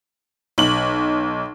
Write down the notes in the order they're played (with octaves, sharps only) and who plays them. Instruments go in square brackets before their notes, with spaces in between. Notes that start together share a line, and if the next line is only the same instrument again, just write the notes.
[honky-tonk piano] B1 F#7